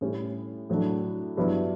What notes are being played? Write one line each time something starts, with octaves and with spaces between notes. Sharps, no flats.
A2 G3 C#4 G4
A2 F#3 A3 D4
G2 F#3 B3 E4 B4